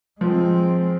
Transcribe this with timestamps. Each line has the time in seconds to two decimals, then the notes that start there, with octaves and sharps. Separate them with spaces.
0.21 F3 G#3 C4